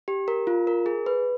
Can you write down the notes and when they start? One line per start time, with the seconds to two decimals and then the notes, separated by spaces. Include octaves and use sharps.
0.08 G4
0.28 A#4
0.47 F4
0.67 A#4
0.86 G#4
1.06 B4